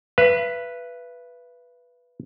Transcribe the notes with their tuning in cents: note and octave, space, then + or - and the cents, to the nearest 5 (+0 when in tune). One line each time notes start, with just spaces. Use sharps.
B4 -5 E5 +45